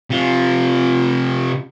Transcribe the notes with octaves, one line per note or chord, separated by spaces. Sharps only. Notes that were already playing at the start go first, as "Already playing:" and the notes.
C3 F4